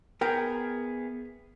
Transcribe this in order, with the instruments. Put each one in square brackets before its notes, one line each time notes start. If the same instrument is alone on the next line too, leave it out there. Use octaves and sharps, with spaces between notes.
[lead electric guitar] B3 G#4 [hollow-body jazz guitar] A#4 G5